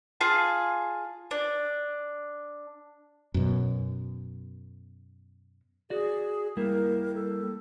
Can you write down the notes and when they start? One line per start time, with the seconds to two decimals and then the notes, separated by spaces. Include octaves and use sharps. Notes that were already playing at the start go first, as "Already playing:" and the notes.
0.21 F4 G#4 A5
1.31 D4
3.34 F#2 B2
5.90 F#4 G#4 D5
6.57 G3 A#3 E4 A#4
7.15 A4